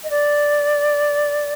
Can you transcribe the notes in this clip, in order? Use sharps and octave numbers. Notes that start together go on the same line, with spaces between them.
D#5
D5